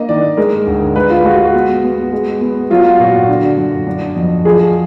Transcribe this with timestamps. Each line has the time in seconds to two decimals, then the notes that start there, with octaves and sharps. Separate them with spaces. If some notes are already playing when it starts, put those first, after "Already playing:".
Already playing: A#3 D4 D#5
0.09 D#3 D5
0.37 G#3 A#4
0.67 D2
0.96 G#3 B4
1.10 F4
1.25 G#3 F#4
1.40 F#4
1.54 B3
1.84 B3
2.12 G#3
2.41 B3
2.70 F#3 F4
2.99 A#2 F#4
3.28 D3
3.58 F#2
3.87 D4
4.16 F2
4.45 F3 G#4